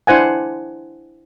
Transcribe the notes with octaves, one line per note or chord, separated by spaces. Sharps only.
D4 E4 C5 F#5 G#5